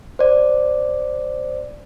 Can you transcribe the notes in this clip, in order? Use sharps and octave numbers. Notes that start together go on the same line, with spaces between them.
C5 D5